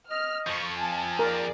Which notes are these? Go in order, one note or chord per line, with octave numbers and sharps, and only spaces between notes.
D#5 F6
F2 F3 C#6
G#5 A5
G#4 A#4 D5